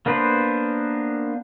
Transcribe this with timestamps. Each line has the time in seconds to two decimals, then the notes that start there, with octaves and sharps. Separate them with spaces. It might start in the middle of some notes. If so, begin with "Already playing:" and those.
0.06 A#3 B3 D4 B4 C5